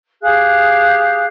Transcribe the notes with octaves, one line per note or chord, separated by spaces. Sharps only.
G4 G#4 F5 F#6